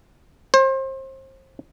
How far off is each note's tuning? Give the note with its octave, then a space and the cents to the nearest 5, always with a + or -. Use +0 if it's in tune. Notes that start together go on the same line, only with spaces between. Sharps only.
C5 +30